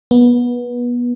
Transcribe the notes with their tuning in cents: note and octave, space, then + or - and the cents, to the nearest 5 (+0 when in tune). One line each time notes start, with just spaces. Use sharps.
B3 -25